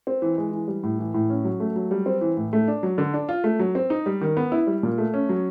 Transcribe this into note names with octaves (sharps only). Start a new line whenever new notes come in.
C4
E3
G#3
E3
G3
A2
E3
A2
C#4
F#3
A3
F#3
G3
C4
E3
A2
A3
D4
F#3
D3
D4
F4
A3
F#3
C4
D#4
G3
D#3
B3
E4
G3
A#2
A3
C#4
F#3